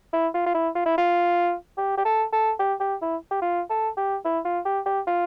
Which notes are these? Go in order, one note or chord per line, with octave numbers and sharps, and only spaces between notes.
E4
F4
F4
E4
F4
E4
F4
G4
G4
A4
A4
G4
G4
E4
G4
F4
A4
G4
E4
F4
G4
G4
F4